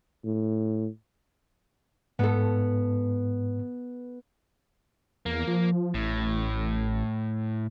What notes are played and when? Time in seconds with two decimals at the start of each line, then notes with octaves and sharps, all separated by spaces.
0.24 A2
2.19 G#2 B3 A4
5.26 E2 A#3
5.47 F3
5.94 A1 A2